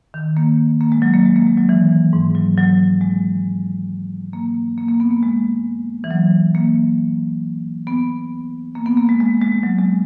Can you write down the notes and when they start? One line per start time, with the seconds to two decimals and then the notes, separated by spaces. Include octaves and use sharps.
0.14 D#3
0.37 A#3
0.81 A#3
0.92 G#3
1.02 F#3
1.14 A#3
1.25 G#3
1.36 A#3
1.47 G#3
1.58 F#3
1.69 E3
2.13 G#2
2.35 F#3
2.57 F#3
3.01 G#3
4.33 A#3
4.78 A#3
4.88 A#3
5.00 B3
5.11 A#3
5.23 G#3
6.04 E3
6.11 F#3
6.55 A#3
7.87 B3
8.75 A#3
8.86 B3
8.97 A#3
9.09 G#3
9.20 G#3
9.41 G#3
9.52 G#3
9.63 F#3
9.78 G#3